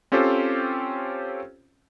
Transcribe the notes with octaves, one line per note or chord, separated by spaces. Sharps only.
C4 C#4 F4 G4 A4 C5